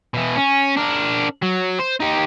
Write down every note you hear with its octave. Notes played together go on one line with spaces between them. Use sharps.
B2 E3
C#4
D4 A#4
F#3
C5
D#4 G4